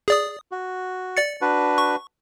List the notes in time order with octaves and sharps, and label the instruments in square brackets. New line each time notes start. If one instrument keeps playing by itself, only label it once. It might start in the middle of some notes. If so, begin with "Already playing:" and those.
[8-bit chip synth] G#4 D5 D#6
[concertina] F#4
[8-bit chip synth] D5 A6 C#7
[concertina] D4 F#4 B4
[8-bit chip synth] C#6